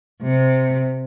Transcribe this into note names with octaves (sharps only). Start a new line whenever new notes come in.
C3